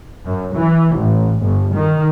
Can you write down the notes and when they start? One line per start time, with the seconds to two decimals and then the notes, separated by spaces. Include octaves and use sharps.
0.25 F#2
0.54 E3
0.96 A1
1.42 G1
1.74 D#3